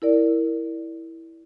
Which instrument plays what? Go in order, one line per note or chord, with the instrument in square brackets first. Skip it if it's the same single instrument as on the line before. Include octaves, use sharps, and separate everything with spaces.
[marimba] E4 A#4 D5